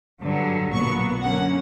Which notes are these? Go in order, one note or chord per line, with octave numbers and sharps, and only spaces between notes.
G2 D3 F#3
B1 A#2 F#3 B3 C#6
F#2 D3 A#3 C#4 F#5